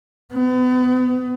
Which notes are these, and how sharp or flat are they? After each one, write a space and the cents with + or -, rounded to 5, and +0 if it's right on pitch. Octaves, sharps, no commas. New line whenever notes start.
B3 +35